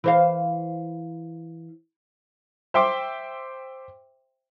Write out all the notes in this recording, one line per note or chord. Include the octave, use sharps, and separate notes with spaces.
E3 C5 F5
C5 E5 G5 C6 D6